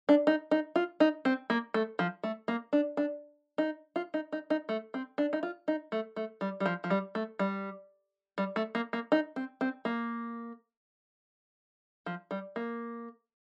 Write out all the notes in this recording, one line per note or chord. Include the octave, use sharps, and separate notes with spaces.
D4
D#4
D#4
F4
D#4
C4
A#3
A3
F3
A3
A#3
D4
D4
D#4
F4
D#4
D#4
D#4
A3
C4
D4
D#4
F4
D#4
A3
A3
G3
G3
F3
F3
G3
A3
G3
G3
A3
A#3
A#3
D#4
C4
C4
A#3
F3
G3
A#3